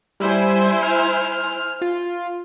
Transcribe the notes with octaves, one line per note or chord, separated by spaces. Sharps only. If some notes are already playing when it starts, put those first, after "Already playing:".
G3 E4 C5 G#5
F6
F4